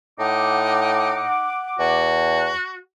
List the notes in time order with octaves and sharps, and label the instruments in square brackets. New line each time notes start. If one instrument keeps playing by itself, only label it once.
[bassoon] A2 [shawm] D#4 [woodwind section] F#5 D6
[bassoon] E2 [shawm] F#4